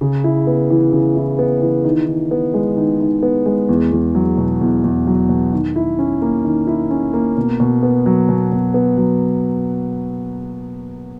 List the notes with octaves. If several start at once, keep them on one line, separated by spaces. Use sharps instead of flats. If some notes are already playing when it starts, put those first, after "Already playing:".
C#3
E4
B3
E3
C#3
E4
B3
E3
D#3
D#3
B3
G#3
D#3
D#3
B3
G#3
E2
E2
F#3
B2
E2
E2
F#3
B2
D#3
E4
C#4
A#3
D#3
E4
C#4
A#3
B2
B2
B3
F#3
B2
B2
B3
F#3